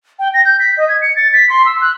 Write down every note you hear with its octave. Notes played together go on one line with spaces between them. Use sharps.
G5
A#6
G6
B6
D#5
G#6
C#7
A6
B6
C6
E6
F#6